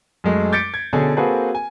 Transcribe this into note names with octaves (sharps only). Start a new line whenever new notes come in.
F#2 G#3 A3
D6 G6 A6 B6 C#7 D7
G#6
B2 D3 C#4 G#4
A#3 C4 F#4 G#4 A4 B4
G#5